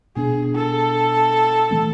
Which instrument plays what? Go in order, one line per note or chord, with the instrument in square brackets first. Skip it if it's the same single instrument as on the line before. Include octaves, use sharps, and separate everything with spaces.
[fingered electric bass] B2 B3 D4 [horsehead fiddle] G#4
[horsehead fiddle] A4
[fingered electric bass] C3 E3 A3 C4